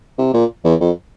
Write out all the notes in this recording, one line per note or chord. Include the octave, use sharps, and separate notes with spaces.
C3
A#2
E2
F2